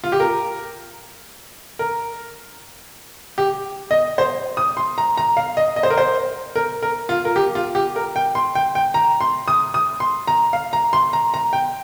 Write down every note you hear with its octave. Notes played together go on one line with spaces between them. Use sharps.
F4
G4
A#4
A#4
G4
D#5
C5
D#6
C6
A#5
A#5
F5
D#5
D#5
C5
A#4
C5
A#4
A#4
F4
A#4
G4
F4
G4
A#4
G5
C6
G5
G5
A#5
C6
D#6
D#6
C6
A#5
F5
A#5
C6
A#5
A#5
G5